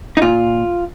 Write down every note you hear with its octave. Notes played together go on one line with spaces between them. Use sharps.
D#4
A#2 F4